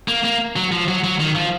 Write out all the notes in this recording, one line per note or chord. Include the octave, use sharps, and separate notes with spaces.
A#3
A#3
F#3
F3
F#3
F#3
D#3
F3